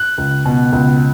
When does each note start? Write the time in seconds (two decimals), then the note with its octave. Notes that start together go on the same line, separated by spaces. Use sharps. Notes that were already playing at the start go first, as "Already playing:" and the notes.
Already playing: F#6
0.18 C#2
0.45 B2
0.73 C#2